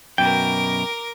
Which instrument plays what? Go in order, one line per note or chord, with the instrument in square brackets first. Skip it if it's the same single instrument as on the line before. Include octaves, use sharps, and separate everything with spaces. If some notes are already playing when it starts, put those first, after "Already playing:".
[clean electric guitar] F#2 B2 [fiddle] A#4 D6 [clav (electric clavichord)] G5